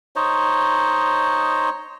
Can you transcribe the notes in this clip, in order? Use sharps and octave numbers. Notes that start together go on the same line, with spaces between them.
D#4 C5 C#5 D#5